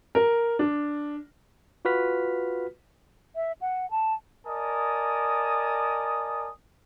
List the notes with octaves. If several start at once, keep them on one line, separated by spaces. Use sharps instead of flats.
A#4
D4
F4 F#4 B4 F6 B6
E5
F#5
A5
A#4 D5 D#5 G#5 A5 D#6